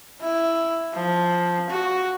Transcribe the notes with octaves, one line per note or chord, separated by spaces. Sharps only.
E4
F3
F#4